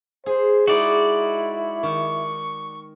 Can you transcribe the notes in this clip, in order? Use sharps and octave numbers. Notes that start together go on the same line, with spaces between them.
G#4 C5
G#3 D#4 E4 F#4 D5
D#3 C#6